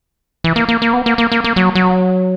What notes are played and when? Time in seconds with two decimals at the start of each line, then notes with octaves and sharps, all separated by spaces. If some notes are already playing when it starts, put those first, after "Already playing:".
0.44 E3
0.56 A#3
0.69 A#3
0.82 A#3
0.93 B3
1.06 A#3
1.18 A#3
1.32 A#3
1.44 A#3
1.56 F#3
1.75 F#3